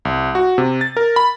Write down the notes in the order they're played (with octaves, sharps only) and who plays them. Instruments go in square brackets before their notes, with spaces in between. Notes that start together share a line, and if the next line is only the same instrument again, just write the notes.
[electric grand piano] C2
F#4
C3
A6
A#4
B5